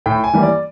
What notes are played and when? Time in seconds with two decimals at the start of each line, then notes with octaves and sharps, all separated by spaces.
0.06 A2 G5
0.24 G#5
0.33 E3 G3 A#3
0.43 D5